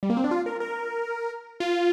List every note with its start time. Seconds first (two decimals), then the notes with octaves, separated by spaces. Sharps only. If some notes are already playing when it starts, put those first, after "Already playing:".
0.03 G3
0.10 A#3
0.17 C4
0.24 D4
0.31 F4
0.46 A#4
0.60 A#4
1.60 F4